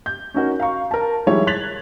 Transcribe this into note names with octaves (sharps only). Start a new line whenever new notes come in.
G6
C#4 D#4 F#4 A#4
F5 A#5 C#6
A#4 A5
D#3 F3 G3 G#3 E4 C#5
F#6 G#6 A6 B6 F7 F#7